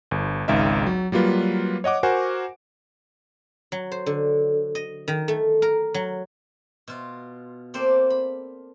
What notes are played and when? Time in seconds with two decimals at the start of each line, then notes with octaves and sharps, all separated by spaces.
0.11 G1
0.48 G#1 C#2 D#4 E5 F5
0.87 F#3
1.12 F#3 G3 A#3 F4 B4
1.84 C#5 D#5 F#5 D6
2.03 F#4 A#4 C5 F#5 G#5
3.72 F#3
3.92 C5
4.06 D3
4.75 D#5
5.08 D#3
5.28 A3
5.62 A#4
5.94 F#3
6.88 B2 F4
7.74 A#3 C4 A4 C5 D5
8.10 B5